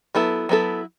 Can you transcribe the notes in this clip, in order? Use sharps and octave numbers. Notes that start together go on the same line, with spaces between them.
F#3 B3 E4 A4
F#3 B3 E4 A4